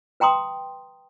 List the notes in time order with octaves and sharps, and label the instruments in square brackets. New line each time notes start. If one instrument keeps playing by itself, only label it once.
[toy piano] B4 G5 A#5 C6 D#6